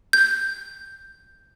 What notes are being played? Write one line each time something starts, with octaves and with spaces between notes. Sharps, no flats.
G6